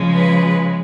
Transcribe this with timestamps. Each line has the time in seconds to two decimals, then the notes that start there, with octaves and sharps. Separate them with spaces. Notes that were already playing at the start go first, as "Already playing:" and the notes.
Already playing: C#3 F3 G#3
0.15 B4